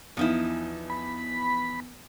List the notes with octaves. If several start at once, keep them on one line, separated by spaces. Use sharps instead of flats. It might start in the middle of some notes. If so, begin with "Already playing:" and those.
E2 F3 D#4 E4
B5